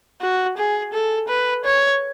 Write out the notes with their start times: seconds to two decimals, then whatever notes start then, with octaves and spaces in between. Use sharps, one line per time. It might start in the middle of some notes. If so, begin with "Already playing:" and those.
0.22 F#4
0.57 G#4
0.93 A4
1.28 B4
1.65 C#5